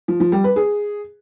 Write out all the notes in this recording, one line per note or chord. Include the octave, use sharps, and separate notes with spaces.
F3
F3
G3
B4
G#4